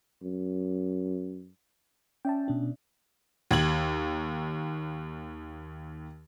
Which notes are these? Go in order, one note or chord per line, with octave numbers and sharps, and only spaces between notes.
F#2
C#4 D5 E5 G5 A5
B2 D4
D#2 G#6 F#7